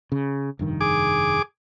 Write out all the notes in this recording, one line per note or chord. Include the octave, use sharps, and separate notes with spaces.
C#3
F1 G2 D#3
G#4 D6